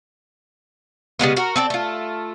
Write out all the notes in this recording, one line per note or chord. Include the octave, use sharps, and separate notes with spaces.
C#3 G3 G#3 B3
F#4 A#4
C4 A4 D5
A3 F4